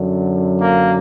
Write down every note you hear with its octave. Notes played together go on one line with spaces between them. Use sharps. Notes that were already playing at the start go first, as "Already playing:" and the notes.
Already playing: F#2 D3 F#3
A#3